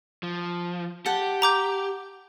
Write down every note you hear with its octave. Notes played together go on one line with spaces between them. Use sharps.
F3
G4 F#5 G5 A5
A#5 D6 G6